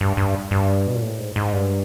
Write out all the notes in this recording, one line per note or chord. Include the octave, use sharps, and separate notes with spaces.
G2
G2
G2
B2
A#2
A2
G#2
G#2
G2